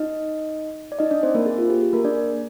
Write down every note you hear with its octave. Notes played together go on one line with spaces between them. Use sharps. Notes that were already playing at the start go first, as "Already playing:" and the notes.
Already playing: D#4 D#5
D5
D#4 D#5
D4 D5
C4 C5
A#3 A#4
G#4
F4
G4
G#4
A#3 A#4
D4 D5